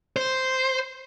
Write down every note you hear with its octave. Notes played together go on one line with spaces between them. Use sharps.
C5